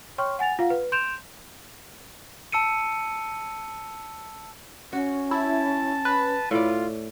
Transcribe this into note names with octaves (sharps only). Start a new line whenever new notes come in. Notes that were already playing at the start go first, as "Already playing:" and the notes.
C#5 G5 C6 C#6 F6
F#5 G#5 A6 F7
F4 F5 F#5
B4
C6 G6 D7 E7 F7
A5 E6 C#7 D#7
C#4 F#4
E4 A5
B4
A2 F4 D5